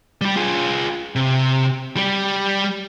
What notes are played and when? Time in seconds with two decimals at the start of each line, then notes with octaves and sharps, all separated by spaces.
0.21 G3 G4
0.36 F4 G#4
1.15 C3
1.96 G3 G4